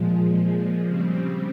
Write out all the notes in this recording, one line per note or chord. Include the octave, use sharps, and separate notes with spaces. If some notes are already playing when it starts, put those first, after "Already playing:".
Already playing: A#2 F3 G#3
C#3 G3 C4